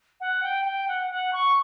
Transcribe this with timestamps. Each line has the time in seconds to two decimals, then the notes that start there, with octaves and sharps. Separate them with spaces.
0.20 F#5
0.43 G5
0.65 G5
0.88 F#5
1.10 F#5
1.33 C#6